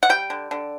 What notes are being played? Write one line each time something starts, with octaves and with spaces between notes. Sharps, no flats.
F#5
G3 G5
D3
D3